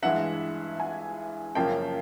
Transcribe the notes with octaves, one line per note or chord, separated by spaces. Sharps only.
G2 E3 G#3 E5 F#5
F#5 G#5
F#2 C#3 F3 A#3 C#4 G5 A5